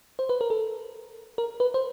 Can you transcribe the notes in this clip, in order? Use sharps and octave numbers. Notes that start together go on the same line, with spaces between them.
C5
B4
A#4
A4
A#4
B4
C5